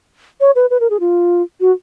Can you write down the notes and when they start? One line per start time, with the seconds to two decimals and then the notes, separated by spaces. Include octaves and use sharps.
0.40 C#5
0.55 B4
0.70 B4
0.80 A#4
0.90 G#4
1.00 F4
1.60 F#4